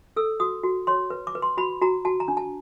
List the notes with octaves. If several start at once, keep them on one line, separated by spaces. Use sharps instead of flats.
A4 E6
F#4 D#6
F#4
C#5 C6
B4
D6
B4
C6
F#4 B5
F#4 A#5
F#4 A5
A#5
D4
A5